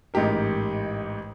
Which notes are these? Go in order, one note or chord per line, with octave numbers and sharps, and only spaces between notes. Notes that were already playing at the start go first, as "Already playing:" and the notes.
A1 G#2 D#4 G4 A#4